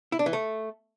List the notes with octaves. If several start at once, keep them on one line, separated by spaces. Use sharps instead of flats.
E4
D4
E3
A3